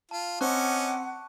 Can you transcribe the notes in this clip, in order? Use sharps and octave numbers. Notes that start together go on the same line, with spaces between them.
F4 A5
C4 C#4 D#5 F#5 A5 C#6 D6 F#6